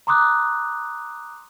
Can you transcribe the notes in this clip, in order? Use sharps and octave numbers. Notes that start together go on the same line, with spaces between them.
A#5 C6 D6 D#6 F#6